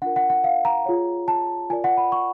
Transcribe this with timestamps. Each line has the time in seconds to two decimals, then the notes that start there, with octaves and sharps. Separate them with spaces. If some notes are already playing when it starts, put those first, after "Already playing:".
0.02 D4 F4 A#4 F#5
0.16 F#5
0.30 F#5
0.44 F5
0.65 A#5
0.86 F4 G#4 C#5
1.28 A5
1.70 F4 A#4 D5 G#5
1.84 F#5
1.97 B5
2.12 C#6